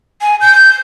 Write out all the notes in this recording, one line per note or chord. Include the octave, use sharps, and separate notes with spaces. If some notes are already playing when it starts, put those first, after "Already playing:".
G#5
G6